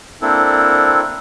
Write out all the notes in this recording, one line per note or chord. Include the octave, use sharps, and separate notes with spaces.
A#3 C4 D4 E4 A4